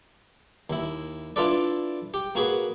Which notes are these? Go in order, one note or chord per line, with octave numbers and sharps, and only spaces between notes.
D#2 E4
D4 E4 F4 A4 B4 D5
G4
A#3 F#4 G#4 B4